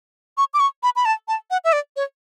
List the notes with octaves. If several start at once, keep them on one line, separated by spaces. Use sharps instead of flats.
C#6
D6
C#6
B5
B5
A5
A5
F#5
E5
D5
C#5